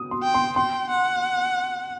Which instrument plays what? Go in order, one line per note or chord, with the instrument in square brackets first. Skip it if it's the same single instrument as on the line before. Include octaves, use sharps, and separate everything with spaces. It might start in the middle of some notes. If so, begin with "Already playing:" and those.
Already playing: [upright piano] D#6
C6
[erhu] G5
[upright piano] C6
[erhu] G5 [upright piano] C6
[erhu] F#5